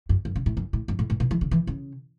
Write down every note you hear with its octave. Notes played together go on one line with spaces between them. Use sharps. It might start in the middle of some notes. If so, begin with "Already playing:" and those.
F#2
F#2
C#3
A2
F#2
A2
F#2
A2
A2
B2
E3
C#3
E3
C#3